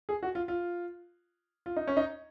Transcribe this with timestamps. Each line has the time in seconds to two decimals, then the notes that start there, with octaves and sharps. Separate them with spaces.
0.09 G#4
0.23 F#4
0.35 F4
0.48 F4
1.66 F4
1.77 D#4
1.88 C#4
1.97 D#4